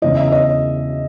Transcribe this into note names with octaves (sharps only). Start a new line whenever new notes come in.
E2 C#3 E3 D#5
E5
D#5